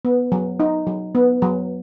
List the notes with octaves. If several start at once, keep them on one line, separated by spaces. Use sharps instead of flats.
B3
F#3
D#4
F#3
B3
F#3